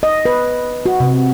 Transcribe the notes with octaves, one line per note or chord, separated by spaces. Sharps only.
D#5
B4
F#4
C3